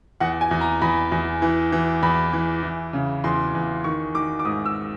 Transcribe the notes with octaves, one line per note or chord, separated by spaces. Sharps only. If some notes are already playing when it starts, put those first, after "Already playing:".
E2 F#5
G#5
E2
A#5
E2 B5
E2
E3
E3
E2 B5
E3
E3
C#3
E2 C6
E2
D#3 C#6
D#3 D6
D6
G#2 D#6
E6